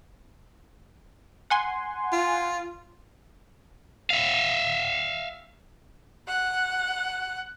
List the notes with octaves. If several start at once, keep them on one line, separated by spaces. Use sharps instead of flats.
F#5 G#5 C6
F4
E5 F5
F#5